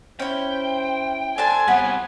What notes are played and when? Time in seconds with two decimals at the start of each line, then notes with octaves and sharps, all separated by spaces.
0.20 C#4 E4 C5 G5
1.38 D4 A4 C5 G#5 A5
1.68 D#2 G3 B3 C4 F#5 B5